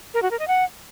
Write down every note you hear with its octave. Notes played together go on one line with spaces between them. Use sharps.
A#4
F#4
A#4
D#5
F#5